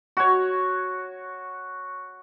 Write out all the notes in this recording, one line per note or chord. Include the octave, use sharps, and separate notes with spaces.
F#4 C#5